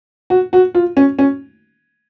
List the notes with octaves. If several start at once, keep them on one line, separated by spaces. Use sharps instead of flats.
F#4
F#4
F4
C#4
C#4